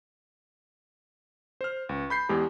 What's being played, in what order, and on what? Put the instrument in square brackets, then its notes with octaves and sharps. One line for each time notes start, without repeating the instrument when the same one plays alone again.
[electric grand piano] C5 F6
C#2
B5 G6 C7
E2 G#3 G4 G#4 A#5